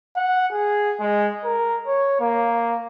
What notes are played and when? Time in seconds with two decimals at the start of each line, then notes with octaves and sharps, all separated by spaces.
0.16 F#5
0.52 G#4
1.00 G#3
1.44 A#4
1.87 C#5
2.20 A#3